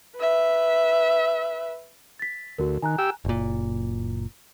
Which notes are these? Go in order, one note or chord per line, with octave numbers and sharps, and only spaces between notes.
B4 E5
A6 B6
D2 F#4 A#4
D#3 G#5 A#5 F#6
G4 G5 E6
F#1 A#2